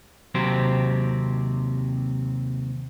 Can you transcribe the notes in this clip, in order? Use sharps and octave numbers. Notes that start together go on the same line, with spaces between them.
D#2 C3 F#3 C4 G4 C5